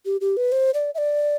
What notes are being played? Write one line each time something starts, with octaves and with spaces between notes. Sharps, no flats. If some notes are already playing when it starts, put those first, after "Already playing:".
G4
G4
B4
C5
D5
E5
D5